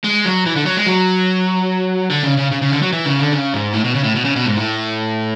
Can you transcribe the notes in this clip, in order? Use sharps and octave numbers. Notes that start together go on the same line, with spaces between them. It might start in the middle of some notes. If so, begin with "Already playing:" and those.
G#3
F#3
E3
D3
F#3
G#3
F#3
D3
C#3
C#3
C#3
C#3
D3
F#3
E3
C#3
D3
C#3
G#2
A2
B2
C#3
A2
B2
C#3
B2
G#2
A2